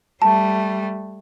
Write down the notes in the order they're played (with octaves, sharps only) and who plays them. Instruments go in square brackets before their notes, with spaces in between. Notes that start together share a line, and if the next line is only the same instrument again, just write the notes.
[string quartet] G3 A3 [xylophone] A5